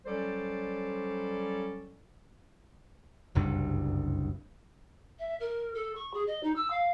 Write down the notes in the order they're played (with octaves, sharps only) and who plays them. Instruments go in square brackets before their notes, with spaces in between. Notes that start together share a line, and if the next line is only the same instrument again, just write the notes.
[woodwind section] F#3 G3 C#4 A4 C5 D5
[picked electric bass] F#1 C2 G2
[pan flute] E5
A#4
A4
C#6
G#4
D#5
D#4
E6
F5